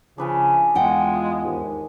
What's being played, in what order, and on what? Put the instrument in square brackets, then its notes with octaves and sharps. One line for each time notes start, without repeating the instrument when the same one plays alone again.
[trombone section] C#2 F3 [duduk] C#3 [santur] D4 B4 G#5
[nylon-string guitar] E2 F#5 G5 [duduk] G#3 [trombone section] F4
[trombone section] D#2 G#2